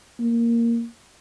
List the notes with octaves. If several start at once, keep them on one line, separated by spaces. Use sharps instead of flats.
A#3